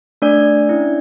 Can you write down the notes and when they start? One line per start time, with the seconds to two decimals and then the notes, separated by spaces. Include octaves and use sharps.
0.22 A3 D4 D5
0.69 C#4 E4